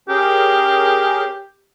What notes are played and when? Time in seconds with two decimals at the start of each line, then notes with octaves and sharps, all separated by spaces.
0.09 C#4 G4 G#4 A#4